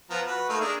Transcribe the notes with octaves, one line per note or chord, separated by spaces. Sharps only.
F3 B3 A#5
F#4 B4
A3 A#3 D#4
D4 G#4 A#4